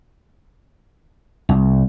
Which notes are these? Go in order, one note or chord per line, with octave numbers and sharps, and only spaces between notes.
C2